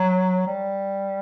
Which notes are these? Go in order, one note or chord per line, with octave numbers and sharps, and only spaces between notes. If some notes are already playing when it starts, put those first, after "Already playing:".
Already playing: F#3
G3